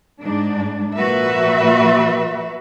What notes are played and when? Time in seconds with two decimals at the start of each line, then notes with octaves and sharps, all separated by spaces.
0.21 G#2 D4
0.96 A#2 F3 A#3 F#4 B4 E5